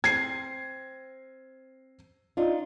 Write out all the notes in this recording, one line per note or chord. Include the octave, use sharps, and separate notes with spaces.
C4 G#6 C7
D4 D#4 F4